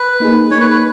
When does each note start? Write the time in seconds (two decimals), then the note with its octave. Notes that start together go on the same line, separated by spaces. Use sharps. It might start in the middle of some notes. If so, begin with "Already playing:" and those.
Already playing: B4
0.20 A#3 D#4 G#4
0.51 A#3 D#4 G#4 C#5
0.60 B4
0.71 B4